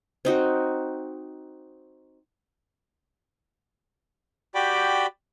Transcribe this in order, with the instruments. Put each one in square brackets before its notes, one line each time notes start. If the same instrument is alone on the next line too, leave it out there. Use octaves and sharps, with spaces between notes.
[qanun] C4 D#4 F#4
[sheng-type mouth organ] F#4 G4 D5 G5 B5 D6